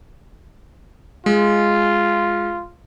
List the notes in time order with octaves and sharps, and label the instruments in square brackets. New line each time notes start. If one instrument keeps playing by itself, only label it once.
[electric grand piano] G#3 [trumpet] F4